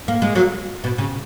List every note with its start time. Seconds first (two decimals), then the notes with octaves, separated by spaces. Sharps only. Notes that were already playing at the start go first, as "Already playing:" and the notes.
0.08 A#3
0.22 G#3
0.35 F#3 A#3
0.84 B2
0.98 C#3